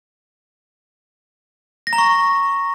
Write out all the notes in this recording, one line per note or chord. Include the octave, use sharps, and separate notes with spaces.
A#6
A#5
C#6